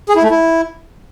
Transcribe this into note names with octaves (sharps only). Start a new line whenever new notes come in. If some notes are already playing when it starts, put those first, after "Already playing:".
G#4
E4
A3
E4